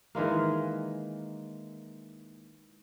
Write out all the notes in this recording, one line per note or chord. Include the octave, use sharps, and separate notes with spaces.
D#3 E3 G#3 A#3